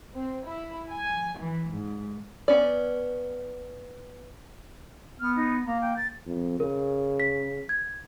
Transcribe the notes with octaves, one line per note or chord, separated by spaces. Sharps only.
C4
E4
G#5
E3
G#2
B3 C#4 D5
B3 F6
D#4
A#3 A#5
G5
A6
F2
C#3 A#4
B6
G#6